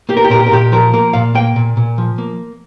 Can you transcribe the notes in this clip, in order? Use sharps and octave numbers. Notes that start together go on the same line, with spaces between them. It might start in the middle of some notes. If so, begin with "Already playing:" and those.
A#3 G4
A#4
G4
A#2 A#4
G4
A#4
A#2 G4
F3 A#4
A#3 A#4
A#2 F5
A#3 G5
A#2
A#2
F3
A#3